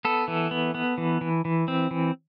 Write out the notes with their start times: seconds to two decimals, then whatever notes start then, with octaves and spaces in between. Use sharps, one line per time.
0.05 B3 A4
0.28 E3
0.51 B3
0.75 B3
0.98 E3
1.21 E3
1.45 E3
1.68 C4
1.91 E3